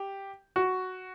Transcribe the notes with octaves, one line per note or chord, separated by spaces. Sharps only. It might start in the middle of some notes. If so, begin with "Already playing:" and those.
Already playing: G4
F#4